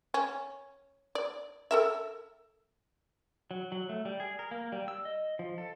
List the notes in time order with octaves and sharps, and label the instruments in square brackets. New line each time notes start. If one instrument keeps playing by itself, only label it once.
[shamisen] C#4
D5
A4 A#4 E5
[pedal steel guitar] F#3
F#3
A3
G3
G#4
A#4
A#3
G3
E6
D#5
F3
A4